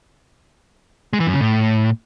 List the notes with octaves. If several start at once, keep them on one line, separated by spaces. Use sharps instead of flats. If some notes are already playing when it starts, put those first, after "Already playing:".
G#3
E3
F#2
C#3
A2